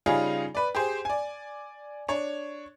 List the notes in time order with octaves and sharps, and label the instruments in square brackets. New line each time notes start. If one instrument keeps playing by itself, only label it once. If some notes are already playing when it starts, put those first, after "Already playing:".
[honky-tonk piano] C#3 G3 C#4 D#4 F4 G#4
B4 D5
G4 G#4 C5
D5 G#5
D4 C#5